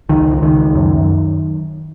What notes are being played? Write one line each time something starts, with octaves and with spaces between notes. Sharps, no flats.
C#2 D#3
C#2
D#3
C#2
F#2
F#2